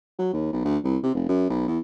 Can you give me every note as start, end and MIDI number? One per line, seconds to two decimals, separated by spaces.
0.19 0.28 54
0.33 0.48 39
0.53 0.63 35
0.64 0.78 38
0.84 0.98 36
1.03 1.13 48
1.15 1.28 29
1.29 1.46 42
1.50 1.64 35
1.68 1.79 40